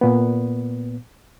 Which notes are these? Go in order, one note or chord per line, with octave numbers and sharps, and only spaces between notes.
A#2 B3